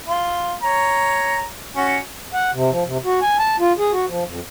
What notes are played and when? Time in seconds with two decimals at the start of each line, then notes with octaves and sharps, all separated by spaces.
0.08 F4
0.63 C#5 A#5
1.76 C#4 F#4
2.34 F#5
2.54 C3
2.71 F3
2.85 C3
3.05 F#4
3.22 G#5
3.39 A5
3.60 F4
3.78 G#4
3.92 F#4
4.08 F3
4.26 F2